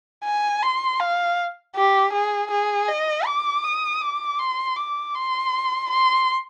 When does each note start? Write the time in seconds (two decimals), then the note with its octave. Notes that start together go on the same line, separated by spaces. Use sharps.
0.24 G#5
0.62 C6
1.00 F5
1.75 G4
2.13 G#4
2.51 G#4
2.88 D#5
3.26 D6
3.64 D#6
4.01 D6
4.39 C6
4.76 D6
5.15 C6
5.90 C6